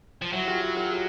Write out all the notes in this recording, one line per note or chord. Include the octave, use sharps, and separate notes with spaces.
F3
F#3 E4 F#4
F4 G4
E4 F#4
F4 G4
F#4 G#4